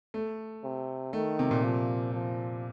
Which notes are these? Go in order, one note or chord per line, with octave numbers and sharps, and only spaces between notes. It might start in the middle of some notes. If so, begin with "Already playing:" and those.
A3
C3
D#3 A3
C3
A#2
F3
F3